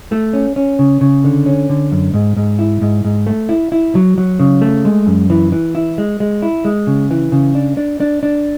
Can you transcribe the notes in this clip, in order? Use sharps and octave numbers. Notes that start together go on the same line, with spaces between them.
A3
C#4
C#4
C#3
C#3
D3
C#4
D3
F#2
G#2
G#2
E4
G#2
G#2
A3
E4
E4
F#3
F#3
C#3
A3
G#3
F#2
E3
E3
E4
G#3
G#3
E4
G#3
C#3
E3
C#3
D4
D4
D4
D4